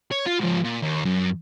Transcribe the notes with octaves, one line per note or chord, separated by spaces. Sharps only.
C#5
F4
G#2 F3
A#2
D#2
F#2